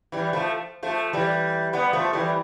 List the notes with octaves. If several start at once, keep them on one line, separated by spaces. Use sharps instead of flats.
E3 G3
F3 A3
F3 A3
E3 G3
G3 B3
F3 A3
E3 G3